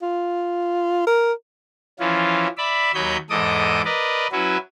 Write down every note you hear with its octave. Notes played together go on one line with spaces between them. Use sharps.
F4
A#4
E3 F3 C#4 F4
D5 E5 B5
D#2 F#3 C#5 D#5 B5 G6
E2 G#2 A4 D#5 D6 D#6
A#4 B4 D5 D#5
F#3 C#4 E4 F#4 B4